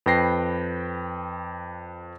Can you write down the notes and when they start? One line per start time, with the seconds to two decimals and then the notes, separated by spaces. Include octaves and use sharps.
0.06 F2 B4 G5 A#6 C7